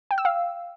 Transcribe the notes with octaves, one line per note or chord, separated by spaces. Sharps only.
G5
E6
F5